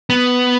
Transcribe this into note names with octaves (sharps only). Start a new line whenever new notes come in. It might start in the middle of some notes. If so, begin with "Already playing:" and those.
B3